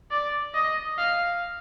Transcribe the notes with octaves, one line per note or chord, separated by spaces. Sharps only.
D5
D#5
F5